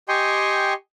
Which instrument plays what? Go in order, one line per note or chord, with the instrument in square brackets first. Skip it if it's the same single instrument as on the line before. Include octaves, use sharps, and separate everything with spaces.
[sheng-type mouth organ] G4 D#5 G5 G#5 C6 C#6